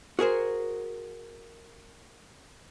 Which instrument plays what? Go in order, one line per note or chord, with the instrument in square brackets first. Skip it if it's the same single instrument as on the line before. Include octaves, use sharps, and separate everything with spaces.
[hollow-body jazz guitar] F#4 G#4 A#4 C5